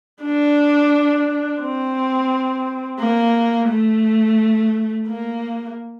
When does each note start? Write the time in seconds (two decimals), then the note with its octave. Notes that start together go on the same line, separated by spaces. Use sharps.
0.23 D4
1.61 C4
2.99 A#3
3.69 A3
5.07 A#3